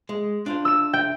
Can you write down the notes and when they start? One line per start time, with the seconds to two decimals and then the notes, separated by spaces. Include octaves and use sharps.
0.09 G#3
0.46 D4 F4 C5
0.65 E6 E7
0.93 G5